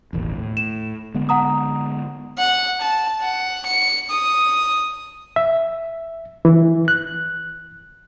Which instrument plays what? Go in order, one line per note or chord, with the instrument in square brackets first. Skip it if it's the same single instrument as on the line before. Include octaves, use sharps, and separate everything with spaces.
[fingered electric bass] E1 A1 D#2
A2
[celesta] E7
[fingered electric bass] D3 G#3 B3
[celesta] F#5 A#5 D#6
[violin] F#5
A5
F#5
C#7
D#6
[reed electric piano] E5
E3
F#6